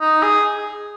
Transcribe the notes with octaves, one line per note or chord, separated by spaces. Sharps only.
D#4
G#4